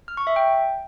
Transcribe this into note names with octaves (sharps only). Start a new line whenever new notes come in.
F6
C#6
E5
G5